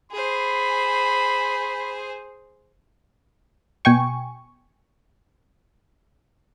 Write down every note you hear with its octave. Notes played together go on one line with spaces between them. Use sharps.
G#4 C5 B5
B2 G5 G#5 C#6